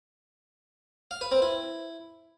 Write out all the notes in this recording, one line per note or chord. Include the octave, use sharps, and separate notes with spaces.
F5
B4
C4
E4